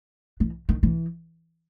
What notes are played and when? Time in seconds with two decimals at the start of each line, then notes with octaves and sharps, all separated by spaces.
0.40 E3
0.69 D#3
0.83 E3